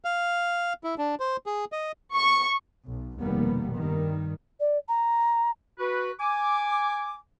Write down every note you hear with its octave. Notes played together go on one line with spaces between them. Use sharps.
F5
E4
D4
C5
G#4
D#5
C#6
B1
F1 D#2 B2 G3 A#3 B3
G2 D#3 G3
D5
A#5
F#4 B4
G#5 D6